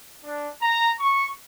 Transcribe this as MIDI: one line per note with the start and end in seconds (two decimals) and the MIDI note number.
0.24 0.49 62
0.62 0.91 82
1.00 1.28 85